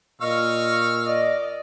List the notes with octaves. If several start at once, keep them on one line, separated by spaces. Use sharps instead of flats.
A#2 D#5 F5 C#6 E6 F6
D5 D#5